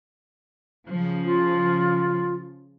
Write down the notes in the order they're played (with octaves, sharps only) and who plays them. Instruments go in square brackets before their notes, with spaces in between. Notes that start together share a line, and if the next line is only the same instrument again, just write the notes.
[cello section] C#3 F3
[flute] F4